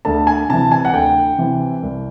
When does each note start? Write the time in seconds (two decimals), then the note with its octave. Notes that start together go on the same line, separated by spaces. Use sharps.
0.05 D2 A5
0.27 G#5
0.50 C3 E3 A5
0.72 G#5
0.85 F#5
0.93 D2 G5
1.38 C3 E3
1.83 C2